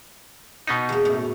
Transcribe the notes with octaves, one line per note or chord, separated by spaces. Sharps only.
B2 B3 D#4
E2 A#3
F#2 A2